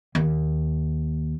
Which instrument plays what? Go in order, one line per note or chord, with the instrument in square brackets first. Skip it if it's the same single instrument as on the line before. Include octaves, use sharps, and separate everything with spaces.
[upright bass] D#2